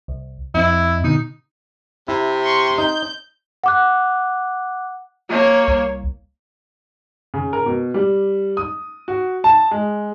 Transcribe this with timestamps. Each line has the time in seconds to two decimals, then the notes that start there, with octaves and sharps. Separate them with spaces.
0.08 C2
0.54 F2 C4 E4 D#5
1.04 B2 D3 D#4
2.08 C3 E4
2.43 C6 C#6
2.78 D#4 G6
3.64 F#5 D6 F#6
5.29 A#3 C#5
5.68 C2
7.34 C#3
7.53 A#4
7.66 B2
7.94 G3
8.57 D#6
9.08 F#4
9.44 A5
9.71 G#3